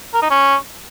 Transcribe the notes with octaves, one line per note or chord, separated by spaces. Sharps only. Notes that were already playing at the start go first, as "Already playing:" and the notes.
A#4
D#4
C#4